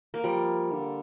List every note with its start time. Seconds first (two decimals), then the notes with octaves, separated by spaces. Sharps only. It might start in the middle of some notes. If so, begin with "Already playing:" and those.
0.14 A#3
0.24 F3 G3
0.72 D3